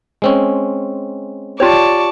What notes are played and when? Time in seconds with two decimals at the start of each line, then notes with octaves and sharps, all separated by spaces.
0.22 G#3 C4 C#4
1.60 F4 G4 C#5 D5 A5 C#6